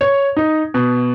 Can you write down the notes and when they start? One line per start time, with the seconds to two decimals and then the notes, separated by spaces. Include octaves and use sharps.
0.01 C#5
0.37 D#4
0.74 B2